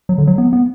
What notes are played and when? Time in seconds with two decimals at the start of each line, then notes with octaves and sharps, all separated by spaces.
0.09 F#3
0.18 D3
0.27 F#3
0.38 B3
0.53 B3